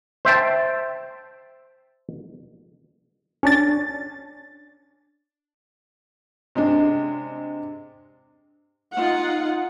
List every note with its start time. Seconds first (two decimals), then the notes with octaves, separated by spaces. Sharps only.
0.25 C5 E5 G5 A5
3.43 C#4 D4 A6
6.55 C3 G#3 D4
8.94 D#4 F4 F#5